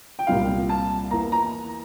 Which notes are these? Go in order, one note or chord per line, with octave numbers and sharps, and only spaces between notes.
G5
C2 A#2 G3 C4 F5
A5
E2 E3 A#3 A#5
A#5